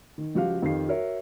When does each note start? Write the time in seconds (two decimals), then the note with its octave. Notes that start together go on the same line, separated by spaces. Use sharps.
0.18 D#3
0.34 C#2 F3 F#4 G4 F5
0.62 F2 D#3 G4 F5 C7
0.88 F#4 A#4 C#5 E5